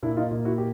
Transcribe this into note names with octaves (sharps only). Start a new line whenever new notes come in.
A#2 D4 E4
D#4 F4
A#2
E4 F#4
G4